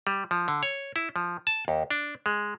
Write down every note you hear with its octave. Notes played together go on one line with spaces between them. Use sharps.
G3
F3
D3
C#5
E4
F3
A5
D#2
D4
G#3